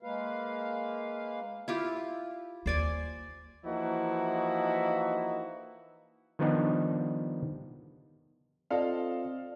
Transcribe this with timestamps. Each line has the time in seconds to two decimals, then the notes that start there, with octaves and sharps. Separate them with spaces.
0.03 G#3 A#3 B4 F5
1.68 E4 F4 G4
2.66 D#2 C5 D5 G#5
3.65 E3 F3 A#3 D#4 E4 F#4
6.39 D#3 F3 G3 B3 D4 D#4
8.71 C4 F4 A4 D5 D#5 F5